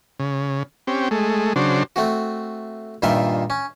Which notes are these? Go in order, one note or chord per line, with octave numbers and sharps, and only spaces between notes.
C#3
C4 C#4 G4
G#3 A3
C#3 F#3 D4 C5
A3 C4 F#4
G2 A#2 D#3 F4 E5 C6
C#4